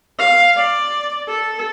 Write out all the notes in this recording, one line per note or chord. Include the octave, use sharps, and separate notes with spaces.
F5
D5
A4